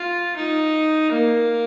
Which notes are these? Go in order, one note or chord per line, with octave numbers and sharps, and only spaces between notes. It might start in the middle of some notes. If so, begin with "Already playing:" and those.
Already playing: F4
D#4
A#3